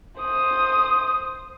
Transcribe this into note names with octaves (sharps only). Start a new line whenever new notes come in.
C5 D#6